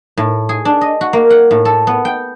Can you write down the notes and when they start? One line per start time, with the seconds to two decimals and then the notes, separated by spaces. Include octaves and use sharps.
0.17 A2
0.49 G#4
0.65 D4
0.81 D#5
1.01 F#4
1.13 A#3
1.30 F#5
1.51 A2
1.65 A4
1.87 B3
2.05 G5